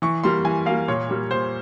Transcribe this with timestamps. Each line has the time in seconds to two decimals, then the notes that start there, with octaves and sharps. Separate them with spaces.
0.02 E3 C#6
0.24 G3 A#3 C6
0.44 E3 G#5
0.66 G3 A#3 F5
0.88 A#2 C#5
1.09 G3 A#3
1.31 A#2 C5